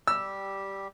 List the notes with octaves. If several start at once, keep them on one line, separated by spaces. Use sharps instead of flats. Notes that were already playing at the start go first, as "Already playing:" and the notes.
G3 G4 E6